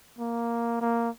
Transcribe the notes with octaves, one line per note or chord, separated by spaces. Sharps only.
A#3
A#3